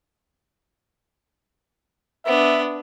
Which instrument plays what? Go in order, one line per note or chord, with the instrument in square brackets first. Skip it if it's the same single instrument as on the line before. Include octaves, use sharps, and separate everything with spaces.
[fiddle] B3 D4 [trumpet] E5